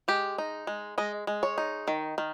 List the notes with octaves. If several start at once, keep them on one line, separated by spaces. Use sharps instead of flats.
G#3 G4
D#4
G#3
G#3 D#5
G#3
C#5
D#4
D#3
D#3